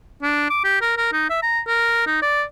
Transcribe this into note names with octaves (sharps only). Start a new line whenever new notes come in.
D4
D6
G4
A#4
A#4
D#4
E5
A#5
A#4
D#4
D5